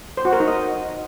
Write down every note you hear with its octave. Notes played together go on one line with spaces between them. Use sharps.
C5
F#4
A#4
D#4
D#5